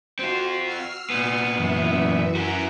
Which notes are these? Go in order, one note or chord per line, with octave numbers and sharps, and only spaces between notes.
C4 F4 F#4
E6 F6 C7
A#2 B3
F#2 E3 E5
F#4 A#4 E5 F#5 A#5